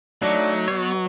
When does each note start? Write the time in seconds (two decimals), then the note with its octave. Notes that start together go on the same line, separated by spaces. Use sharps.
0.22 F#3 A3 D4 D#4
0.68 B2 B3 C#5